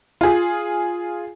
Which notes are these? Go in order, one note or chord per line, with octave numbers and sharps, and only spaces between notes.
F4 G#4